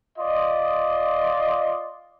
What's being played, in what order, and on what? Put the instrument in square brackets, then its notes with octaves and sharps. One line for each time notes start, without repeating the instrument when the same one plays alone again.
[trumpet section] F4 D5 D#5 C6